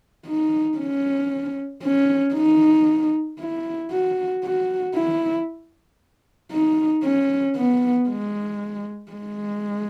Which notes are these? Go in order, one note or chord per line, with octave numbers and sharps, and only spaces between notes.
D#4
C#4
C#4
D#4
E4
F#4
F#4
E4
D#4
C#4
B3
G#3
G#3